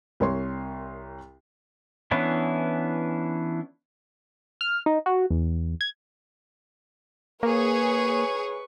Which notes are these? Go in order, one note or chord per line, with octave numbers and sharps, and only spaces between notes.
C2 A#4 C#5 C6
E3 B3 C#4 D4 E4
F6
D#4
F#4
E2
G#6
A#3 G#4 B4 C#5 C#6